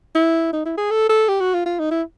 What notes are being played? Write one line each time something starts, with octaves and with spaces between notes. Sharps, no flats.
E4
D#4
E4
G#4
A4
A4
G4
F#4
F4
F4
D#4
E4